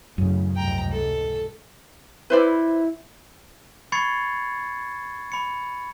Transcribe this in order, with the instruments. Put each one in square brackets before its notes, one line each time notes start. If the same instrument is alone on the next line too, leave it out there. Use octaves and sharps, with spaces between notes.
[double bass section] A1 C#3 [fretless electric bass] F#2
[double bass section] F1 C#2 G#2 [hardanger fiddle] G5 A#5
[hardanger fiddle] A4
[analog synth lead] E4 [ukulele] B4 C5 D5
[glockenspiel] B5 C#6 G#6 A6 C7 C#7
B5 C#7